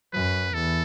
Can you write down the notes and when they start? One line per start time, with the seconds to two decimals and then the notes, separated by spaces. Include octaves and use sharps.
0.13 F#2 B4
0.54 E2 A4